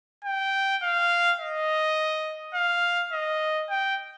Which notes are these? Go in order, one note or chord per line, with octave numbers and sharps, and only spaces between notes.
G5
F5
D#5
F5
D#5
G5